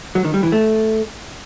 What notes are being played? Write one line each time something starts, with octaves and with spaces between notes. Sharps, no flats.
F#3
D#3
G3
E3
A3